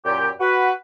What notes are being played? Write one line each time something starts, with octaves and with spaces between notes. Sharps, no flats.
F#2 A#2 G4 G5
F#4 B4